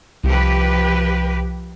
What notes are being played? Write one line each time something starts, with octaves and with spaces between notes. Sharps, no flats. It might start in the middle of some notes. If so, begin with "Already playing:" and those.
C2 F3 G4 B4